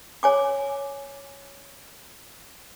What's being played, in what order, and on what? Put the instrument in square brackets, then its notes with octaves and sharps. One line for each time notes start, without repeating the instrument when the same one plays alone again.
[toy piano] C#5 G#5 D6